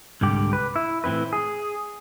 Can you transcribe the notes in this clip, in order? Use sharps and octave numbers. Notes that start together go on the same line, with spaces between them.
C2 G#2 D3 G4
B4
E4
A2 E3 C4 E4 B4
G#4